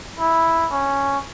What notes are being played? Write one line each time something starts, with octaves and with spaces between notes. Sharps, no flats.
E4
C#4